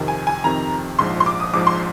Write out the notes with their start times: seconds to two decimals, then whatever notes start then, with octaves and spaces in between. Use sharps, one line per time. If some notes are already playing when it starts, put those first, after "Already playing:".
Already playing: F2 C3 D#3
0.08 G#5
0.27 G#5
0.44 F2 C3 D#3 A#5
0.99 A#1 G#2 F3 C6
1.20 C6
1.26 D6
1.40 D#6
1.53 A#1 G#2 F3 D6
1.67 C6